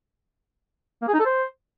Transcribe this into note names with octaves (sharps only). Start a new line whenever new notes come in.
A#3
G#4
D#4
A4
C5